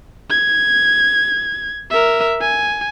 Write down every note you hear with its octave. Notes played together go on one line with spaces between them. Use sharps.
G#6
A#4 E5
G#5